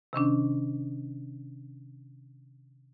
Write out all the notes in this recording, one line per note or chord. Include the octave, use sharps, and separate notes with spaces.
C3 D#3 C#4 D4